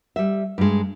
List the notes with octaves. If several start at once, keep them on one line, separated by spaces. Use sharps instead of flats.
G3 E5
G2 G#3